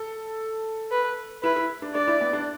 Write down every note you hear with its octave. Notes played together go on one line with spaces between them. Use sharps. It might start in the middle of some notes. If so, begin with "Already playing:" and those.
Already playing: A4
B4
E4 B4
E4
D4
D4 D5
E4
B3
D4